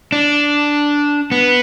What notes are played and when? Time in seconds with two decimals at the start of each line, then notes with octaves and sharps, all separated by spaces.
0.12 D4
1.32 B3